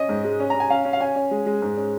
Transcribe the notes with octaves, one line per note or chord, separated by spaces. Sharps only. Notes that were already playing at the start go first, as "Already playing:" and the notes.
Already playing: C#4 D#5
G#2
G#3
C#4
C#4 A#5
G#5
C#4 F5
C#4
F5
C#4 G#5
C#4
G#3
G#3
G#2
C#4